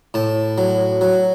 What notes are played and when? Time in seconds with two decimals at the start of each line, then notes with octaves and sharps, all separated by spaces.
0.14 A2 A5
0.58 F#3
1.01 F#3